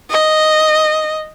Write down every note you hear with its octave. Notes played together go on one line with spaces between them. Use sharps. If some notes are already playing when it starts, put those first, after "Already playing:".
D#5